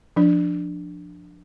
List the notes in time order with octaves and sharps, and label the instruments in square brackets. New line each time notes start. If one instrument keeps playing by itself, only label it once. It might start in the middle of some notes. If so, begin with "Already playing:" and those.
[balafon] F3 D4